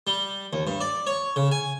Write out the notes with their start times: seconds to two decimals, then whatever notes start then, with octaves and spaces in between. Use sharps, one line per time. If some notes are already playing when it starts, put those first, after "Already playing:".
0.07 G3
0.53 D#2
0.67 G2
0.81 D5
1.07 C#5
1.36 C#3
1.51 G#5